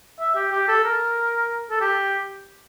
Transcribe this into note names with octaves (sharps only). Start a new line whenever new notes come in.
E5
G4
G4
A4
A#4
A4
G4